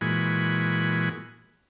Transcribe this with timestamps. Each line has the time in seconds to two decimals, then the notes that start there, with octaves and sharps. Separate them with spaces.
0.01 A#2 E3 G#3 F#4 G#5 B5